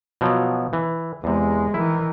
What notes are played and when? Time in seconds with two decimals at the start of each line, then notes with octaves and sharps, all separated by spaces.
0.21 B2 F3 F#3
0.73 E3
1.24 E2 C3 G#3
1.74 D#3 E3 E4